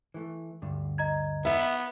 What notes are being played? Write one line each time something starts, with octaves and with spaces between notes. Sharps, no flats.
E3 A3
D2 G2 D3
D#5 A#5 G#6
B3 E5 F#5